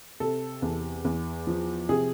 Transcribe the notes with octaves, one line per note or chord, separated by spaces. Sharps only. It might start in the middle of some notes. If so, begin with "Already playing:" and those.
C3 A4
E2
E2
F3
C3 G#4